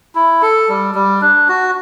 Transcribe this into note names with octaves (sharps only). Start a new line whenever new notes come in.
E4
A4
G3
G3
D4
F#4